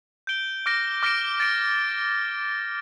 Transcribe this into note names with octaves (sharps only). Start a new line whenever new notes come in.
G6 D7 G7
D6 F6 A#6 D7
D6 F6 A#6 D7
A6 D7